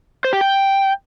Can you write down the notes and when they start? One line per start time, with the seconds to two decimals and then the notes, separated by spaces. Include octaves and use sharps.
0.25 C5
0.33 G4
0.41 G5